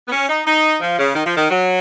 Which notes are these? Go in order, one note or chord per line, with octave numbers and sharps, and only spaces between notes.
B3
C#4
D#4
D#4
F3
C#3
D#3
F3
D#3
F#3